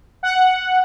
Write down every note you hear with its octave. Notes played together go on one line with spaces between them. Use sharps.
F#5